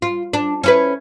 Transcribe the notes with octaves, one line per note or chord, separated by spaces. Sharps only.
F4
D4
C#4 E4 B4